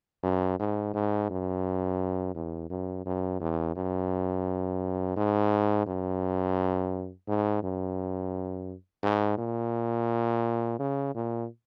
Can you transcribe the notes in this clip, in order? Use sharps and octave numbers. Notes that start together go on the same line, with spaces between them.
F#2
G#2
G#2
F#2
E2
F#2
F#2
E2
F#2
G#2
F#2
G#2
F#2
G#2
A#2
C#3
A#2